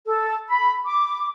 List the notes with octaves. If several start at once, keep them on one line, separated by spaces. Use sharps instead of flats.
A4
B5
D6